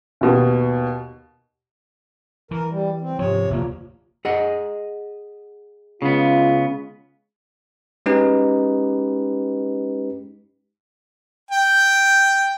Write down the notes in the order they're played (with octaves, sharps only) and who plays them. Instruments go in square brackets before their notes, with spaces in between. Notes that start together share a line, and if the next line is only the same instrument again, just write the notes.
[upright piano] D#2 B2
[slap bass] E3 [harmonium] A#4
[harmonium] G3
C4
[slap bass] G#2 F3 [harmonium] C3 C#5
[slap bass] F1 D2 A#3 [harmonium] A#2 F3
[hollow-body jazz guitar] G#4 D#5 F#5
[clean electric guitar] C#3 B3 [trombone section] G#3 F4
[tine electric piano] G#3 C#4 D#4 G4 B4
[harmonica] G5